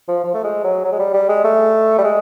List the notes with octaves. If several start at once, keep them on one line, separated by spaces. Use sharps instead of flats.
F3
F3
A3
G#3
F#3
F#3
G#3
G3
G3
G#3
A3
G3
G#3